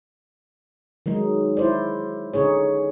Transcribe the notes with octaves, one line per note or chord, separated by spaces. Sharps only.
D#3 F#3 G#3 D#4
E4 C5 D5
D3 C#4 D#4 G#4 C#5